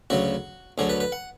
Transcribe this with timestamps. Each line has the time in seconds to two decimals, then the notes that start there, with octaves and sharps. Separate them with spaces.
0.10 D2 C#3 F#3 F#4
0.78 D2 D3 F#3 G#4
0.89 B4
1.00 B4
1.12 F#5